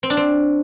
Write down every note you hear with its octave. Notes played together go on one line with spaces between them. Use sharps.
C4
D4
C4